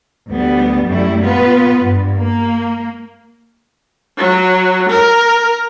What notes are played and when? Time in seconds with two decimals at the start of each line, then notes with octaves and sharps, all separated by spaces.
0.28 D2 G3 B3
0.86 F#2 G3 A3 E4
1.20 A#2 B3 F4 B4
1.79 G2
2.16 A#3
4.17 F#3
4.89 A#4